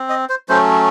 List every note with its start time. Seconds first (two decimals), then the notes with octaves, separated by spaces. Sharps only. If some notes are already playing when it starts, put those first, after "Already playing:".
Already playing: C4
0.09 D#5
0.29 C5
0.49 F#3 A3 C#4 C5